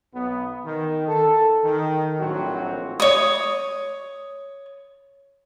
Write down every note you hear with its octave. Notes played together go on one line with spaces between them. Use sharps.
B1 B3
D#3
A4
D#3
A#1 A2 F#3 C4 F#4
C#5 D#6